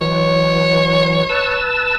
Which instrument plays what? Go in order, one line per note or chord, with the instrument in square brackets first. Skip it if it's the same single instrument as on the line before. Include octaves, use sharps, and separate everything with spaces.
[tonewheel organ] E3 F#3 [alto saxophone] C#5
[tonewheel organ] B4 A5 E6